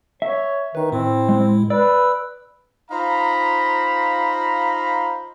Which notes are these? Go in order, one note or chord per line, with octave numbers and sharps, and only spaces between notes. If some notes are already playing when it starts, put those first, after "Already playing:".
C#5 E5
D#3 D#4 B4
A2 C4 E4
G#3
B4 D5 E6
D#4 F4 C5 F5 A#5 B5